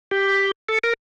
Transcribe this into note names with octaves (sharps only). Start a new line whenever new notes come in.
G4
A4
A#4